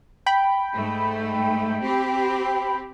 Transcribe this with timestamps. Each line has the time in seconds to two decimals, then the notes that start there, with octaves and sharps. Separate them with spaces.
0.26 G5 B5
0.74 G#2 A3
1.82 C4 G4